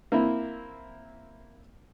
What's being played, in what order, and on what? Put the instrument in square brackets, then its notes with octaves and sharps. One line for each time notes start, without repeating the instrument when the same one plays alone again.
[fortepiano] A#3 C4 E4